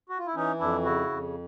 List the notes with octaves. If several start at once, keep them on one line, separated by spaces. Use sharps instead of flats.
F#4
F4
E4
E3 C#4 D#4
F2 D4 E4
C#3 E4 F#4
F2